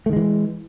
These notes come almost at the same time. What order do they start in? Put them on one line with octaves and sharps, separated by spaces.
A3 D#3 G#3 E3